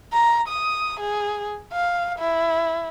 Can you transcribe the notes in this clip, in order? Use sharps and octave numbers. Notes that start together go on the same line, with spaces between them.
A#5
D#6
G#4
F5
E4